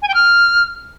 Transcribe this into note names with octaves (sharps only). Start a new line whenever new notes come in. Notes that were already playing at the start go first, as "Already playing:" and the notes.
G#5
G5
F6